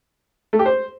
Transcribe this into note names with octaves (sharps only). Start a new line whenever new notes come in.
A3
G4
C5